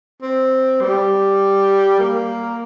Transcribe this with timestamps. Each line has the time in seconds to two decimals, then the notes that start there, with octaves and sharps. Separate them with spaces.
0.22 C4
0.81 G3
1.99 A#3